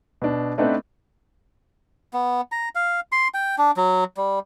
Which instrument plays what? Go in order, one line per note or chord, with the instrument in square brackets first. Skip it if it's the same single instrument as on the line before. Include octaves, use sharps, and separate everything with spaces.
[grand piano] B2 D4
A3 B3 C4 D4 D#4 B4
[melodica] B3
A#5
F5
C6
G5
D4
F#3
G3